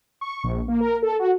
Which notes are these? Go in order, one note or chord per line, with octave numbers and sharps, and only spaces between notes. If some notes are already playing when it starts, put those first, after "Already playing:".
C#6
A#1
A#3
A#4
A4
F#4